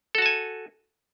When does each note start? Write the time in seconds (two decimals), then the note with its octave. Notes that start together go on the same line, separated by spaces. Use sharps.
0.15 A4
0.18 F#4
0.22 A5
0.26 G#5